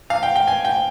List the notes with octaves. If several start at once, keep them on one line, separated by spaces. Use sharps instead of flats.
F5
G5
G5
G#5
G5